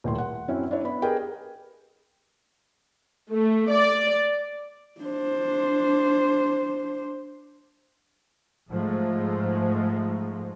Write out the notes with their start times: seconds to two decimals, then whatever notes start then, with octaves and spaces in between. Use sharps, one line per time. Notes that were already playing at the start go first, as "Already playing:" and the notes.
0.04 D#1 A2 C6
0.18 F#5
0.48 F#2 C4 C#4 E4
0.71 D4 E4 C#5
0.84 B3 B5
1.02 G4 G#4 A#4 B4 D#5 G5
3.31 A3
3.71 D5
5.01 D4 C5
8.69 G#2 F3 G#3 A3